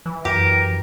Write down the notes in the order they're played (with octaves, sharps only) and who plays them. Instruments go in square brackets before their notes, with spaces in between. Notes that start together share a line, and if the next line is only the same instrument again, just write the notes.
[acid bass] E3
[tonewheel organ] F#2 [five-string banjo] G4 [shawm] A#4